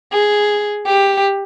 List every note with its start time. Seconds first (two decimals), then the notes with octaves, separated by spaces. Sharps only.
0.12 G#4
0.86 G4